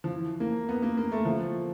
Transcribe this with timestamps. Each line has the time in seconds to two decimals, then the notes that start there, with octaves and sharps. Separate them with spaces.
0.04 F3
0.13 E3
0.40 A#3
0.69 B3
0.82 A#3
0.97 A#3
1.12 A3
1.25 F3